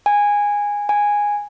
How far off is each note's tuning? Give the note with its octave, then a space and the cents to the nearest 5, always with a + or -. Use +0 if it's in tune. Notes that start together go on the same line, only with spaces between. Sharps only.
G#5 -15
G#5 -10